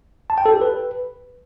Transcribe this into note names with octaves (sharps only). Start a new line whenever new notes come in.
A5
G5
A4
G4
B4